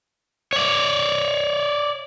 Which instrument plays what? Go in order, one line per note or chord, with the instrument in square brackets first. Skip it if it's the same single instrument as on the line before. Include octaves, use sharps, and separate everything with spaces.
[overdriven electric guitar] C#5 D5